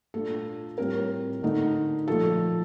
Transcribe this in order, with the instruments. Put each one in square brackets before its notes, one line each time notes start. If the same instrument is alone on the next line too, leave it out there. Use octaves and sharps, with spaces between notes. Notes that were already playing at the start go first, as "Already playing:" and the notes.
[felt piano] A#2 A3 D4 F4 A4
A2 G3 C4 F4 A#4
D3 A3 D#4
A#2 F3 A3 A4